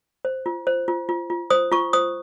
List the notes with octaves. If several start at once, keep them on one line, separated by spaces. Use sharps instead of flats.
C5
F4
C5
F4
F4
F4
C5 D#6
F4 C#6
C5 D#6